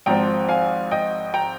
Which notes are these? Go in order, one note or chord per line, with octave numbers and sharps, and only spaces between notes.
G#1 G#2 F3 C4 G5 A#5
F5 G#5
D#5 G5
G5 A#5